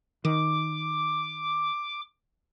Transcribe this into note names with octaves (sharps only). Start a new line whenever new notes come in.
D#3 D6